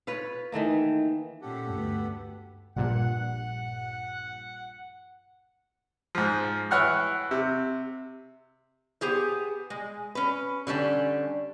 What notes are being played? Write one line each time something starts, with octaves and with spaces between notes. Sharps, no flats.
F4 B4 C#5 F5
D#3 E3 A3 A#3
A#2 C#4 G4 A4 F#5
D2 G2 B3
A#1 G2 A#2 F#5
G#2 F3
E3 C#5 F#5 C#6 F6
C3
B3 G4 G#4 C5
G#3
C#4 B4
D3 G3 C#4 D4